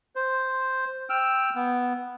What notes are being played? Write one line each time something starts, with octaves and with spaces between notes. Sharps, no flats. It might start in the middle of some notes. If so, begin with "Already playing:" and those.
C5
G5 E6 F6
B3